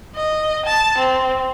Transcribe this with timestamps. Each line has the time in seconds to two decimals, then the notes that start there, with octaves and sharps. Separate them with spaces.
0.15 D#5
0.66 A5
0.98 C4